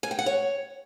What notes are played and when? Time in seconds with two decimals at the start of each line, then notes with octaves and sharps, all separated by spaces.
0.03 G#5
0.11 G5
0.19 F#5
0.26 C#5